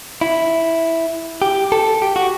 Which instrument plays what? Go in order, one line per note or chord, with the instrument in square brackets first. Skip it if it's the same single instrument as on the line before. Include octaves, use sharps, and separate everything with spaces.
[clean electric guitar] E4
G4
A4
G4
F#4